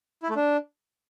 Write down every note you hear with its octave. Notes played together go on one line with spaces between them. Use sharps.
E4
A3
D4